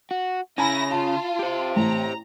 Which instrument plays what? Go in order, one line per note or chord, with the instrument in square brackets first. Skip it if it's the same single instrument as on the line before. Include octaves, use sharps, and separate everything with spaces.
[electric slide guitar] F#4
[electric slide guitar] C#3 C#4 [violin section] E4 A#6 [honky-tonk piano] G#5 A#5 B5
[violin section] F4 [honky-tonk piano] A5
[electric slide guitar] G4 C5
[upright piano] A1 [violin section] A#5